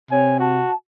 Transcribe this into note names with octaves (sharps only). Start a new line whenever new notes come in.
C3 C#5 G#5
F#4 A5